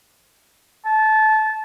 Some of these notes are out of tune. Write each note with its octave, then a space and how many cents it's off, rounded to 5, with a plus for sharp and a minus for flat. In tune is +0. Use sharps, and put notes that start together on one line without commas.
A5 -20